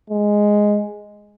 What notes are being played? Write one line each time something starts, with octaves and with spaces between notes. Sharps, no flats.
G#3